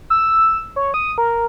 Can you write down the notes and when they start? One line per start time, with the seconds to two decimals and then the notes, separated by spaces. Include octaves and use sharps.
0.10 E6
0.76 C#5
0.94 D#6
1.18 A#4